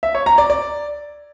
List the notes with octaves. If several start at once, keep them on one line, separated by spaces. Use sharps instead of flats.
E5
C#5
A#5
D5
D5